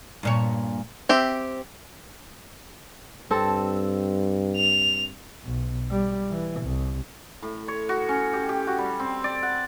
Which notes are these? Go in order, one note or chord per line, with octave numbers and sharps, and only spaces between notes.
G2 A#2 C#5
C4 G4 E5
G2 C4 A4
F7
B1
G3
E3
C2
A2
C#5
F#4
C#4
G4
G4
F#4
G3
C4
D5
F#5